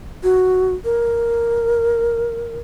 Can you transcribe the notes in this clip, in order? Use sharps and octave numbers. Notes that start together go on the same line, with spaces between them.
F#4
A#4